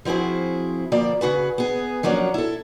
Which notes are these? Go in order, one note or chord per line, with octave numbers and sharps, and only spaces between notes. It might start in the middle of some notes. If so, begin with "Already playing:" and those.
F3 C4 E4 F#4 G#4
D2 F3 A#3 D5
C#3 F#4 G#4 B4
B3 G#4
F3 F#3 A#3 C#4 D4
E4 A4